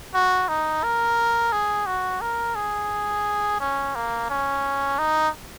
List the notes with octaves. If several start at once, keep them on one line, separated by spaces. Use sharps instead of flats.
F#4
D#4
A#4
G#4
F#4
A#4
G#4
C#4
A#3
C#4
D#4